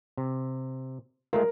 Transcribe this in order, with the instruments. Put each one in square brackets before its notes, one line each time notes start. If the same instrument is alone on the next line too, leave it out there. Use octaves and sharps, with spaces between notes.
[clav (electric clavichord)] C3
[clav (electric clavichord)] G#3 A3 F4 [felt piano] A#4